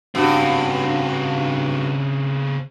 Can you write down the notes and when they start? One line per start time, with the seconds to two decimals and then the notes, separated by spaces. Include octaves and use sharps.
0.15 G2 C#3 C4 F#4